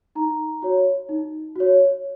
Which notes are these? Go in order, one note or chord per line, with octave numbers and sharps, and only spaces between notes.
D#4 A#5
F#4 C#5
D#4
F#4 C#5